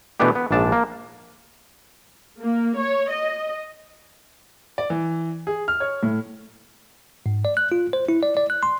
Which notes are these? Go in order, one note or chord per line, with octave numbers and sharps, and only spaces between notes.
B2 E3 A3 B3 D4 G4
B3
A#1 G#2 D4 A5
A#3
A#3
C#5
D#5
D5
E3
G#4
F6
C#5
A2
G#2
D5
F#6
F4
C5
E4
D5
D5
F#6
C6